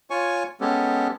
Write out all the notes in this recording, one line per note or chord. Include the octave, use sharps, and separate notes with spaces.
F4 C#5 G#5 C#6
G#3 B3 C#4 G4 A4